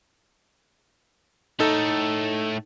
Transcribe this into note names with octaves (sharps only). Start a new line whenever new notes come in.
A2 A3 D#4 A4